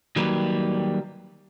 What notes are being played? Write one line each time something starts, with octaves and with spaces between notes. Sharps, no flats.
D#3 F#3 G3 A#3 G4 B4